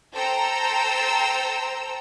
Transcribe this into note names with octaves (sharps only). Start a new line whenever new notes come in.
A4 C5 G5 A#5 E6